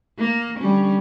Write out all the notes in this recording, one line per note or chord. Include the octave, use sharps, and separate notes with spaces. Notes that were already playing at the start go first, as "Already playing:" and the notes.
A#3
D3 G3 C#4